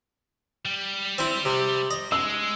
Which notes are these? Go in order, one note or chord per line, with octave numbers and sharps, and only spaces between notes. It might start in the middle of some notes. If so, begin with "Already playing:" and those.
G3
C4 E4
C3
D#5
G#3 E6